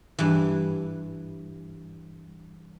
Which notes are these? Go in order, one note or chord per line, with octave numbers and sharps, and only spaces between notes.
G2 E3